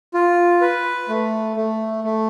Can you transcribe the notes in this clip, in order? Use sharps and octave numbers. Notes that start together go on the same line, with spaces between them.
F4
B4
A3
A3
A3